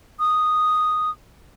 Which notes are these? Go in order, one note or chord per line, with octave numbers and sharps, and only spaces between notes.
D#6